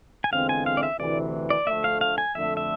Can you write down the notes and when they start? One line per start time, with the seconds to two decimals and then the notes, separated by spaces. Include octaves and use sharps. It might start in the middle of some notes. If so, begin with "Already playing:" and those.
0.24 G#5
0.32 E2 D3 G#3 C4 F4 F5
0.49 G#5
0.66 F5
0.77 D5
0.83 E5
0.99 D2 C3 E3 D5
1.50 D5
1.67 D2 D3 F3 A3 E5
1.84 F5
2.01 F5
2.18 G#5
2.34 F2 D3 A3 E5
2.57 E5